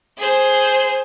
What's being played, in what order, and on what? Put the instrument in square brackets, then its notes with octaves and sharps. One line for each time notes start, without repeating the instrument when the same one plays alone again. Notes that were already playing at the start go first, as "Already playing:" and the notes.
[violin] G#4 C5